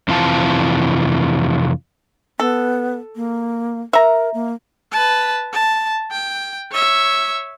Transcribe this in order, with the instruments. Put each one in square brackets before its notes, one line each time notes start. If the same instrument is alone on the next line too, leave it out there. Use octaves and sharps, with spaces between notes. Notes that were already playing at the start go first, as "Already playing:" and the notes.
[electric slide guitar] F2 C3 E3 F4 A5
[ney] B3 [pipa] A4
[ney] A#3
[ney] A#4 [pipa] E5 A#5
[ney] A#3
[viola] B4 A5
A5
G5
C#5 E5